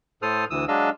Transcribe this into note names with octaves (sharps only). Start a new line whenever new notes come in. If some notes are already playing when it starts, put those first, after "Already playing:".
A2 A4 C5 D#6 F6
D2 E3 D#6 E6
F#3 G#3 D4 D#5 F5 E6